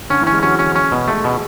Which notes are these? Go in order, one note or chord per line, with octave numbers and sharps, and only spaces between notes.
D3 C#4
E3
C#4
G#3
F#3 C#4
C#4
C#4
B2
G#3 A3
B2